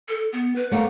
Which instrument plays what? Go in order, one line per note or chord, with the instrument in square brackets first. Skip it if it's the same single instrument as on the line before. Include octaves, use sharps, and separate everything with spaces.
[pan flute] A4
B3
B4
[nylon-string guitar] A3 C#5 [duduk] A#3 [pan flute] F#5